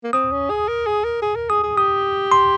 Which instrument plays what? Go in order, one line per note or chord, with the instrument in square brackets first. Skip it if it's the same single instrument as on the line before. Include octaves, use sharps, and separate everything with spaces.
[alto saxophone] A#3
[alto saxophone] C4 [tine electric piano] D#6
[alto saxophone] C#4
G#4
A#4
G#4
A#4
G#4
A#4
[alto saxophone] G#4 [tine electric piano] D#6
[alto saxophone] G#4
[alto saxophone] G4 [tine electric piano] D#6
[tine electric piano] C6